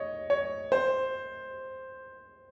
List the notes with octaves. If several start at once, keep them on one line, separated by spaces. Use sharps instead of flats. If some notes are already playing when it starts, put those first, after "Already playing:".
Already playing: C#5 D#5
C#5
C5